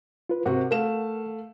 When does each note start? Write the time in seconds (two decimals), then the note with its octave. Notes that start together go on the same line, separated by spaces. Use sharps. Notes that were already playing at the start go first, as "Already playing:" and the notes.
0.29 F4 B4
0.46 C3 F#4 A#4 F#5
0.71 A3 F5 E7